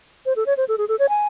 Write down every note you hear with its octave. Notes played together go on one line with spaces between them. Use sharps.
C5
A4
C#5
C5
A4
G#4
A4
C#5
G#5